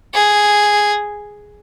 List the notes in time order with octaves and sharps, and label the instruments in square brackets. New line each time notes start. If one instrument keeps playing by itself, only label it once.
[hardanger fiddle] G#4